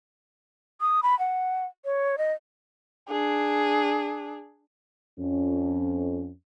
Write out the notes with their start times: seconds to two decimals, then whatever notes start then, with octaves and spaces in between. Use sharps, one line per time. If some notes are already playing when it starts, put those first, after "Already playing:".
0.81 D#6
1.03 B5
1.19 F#5
1.85 C#5
2.18 D#5
3.08 D4 G#4
5.19 F2 C#4